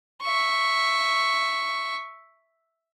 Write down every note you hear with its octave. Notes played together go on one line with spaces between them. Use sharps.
E5 C#6